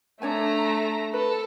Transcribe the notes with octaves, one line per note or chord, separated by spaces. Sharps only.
A3 D4 C#5 G#5 A#5
A4 B4